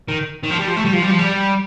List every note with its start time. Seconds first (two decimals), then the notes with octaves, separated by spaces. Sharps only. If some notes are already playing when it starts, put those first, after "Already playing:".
0.09 D#3
0.44 D#3
0.51 F3
0.59 G3
0.68 F3
0.77 A3
0.85 G3
0.93 F3
1.02 G3
1.11 F3
1.19 G3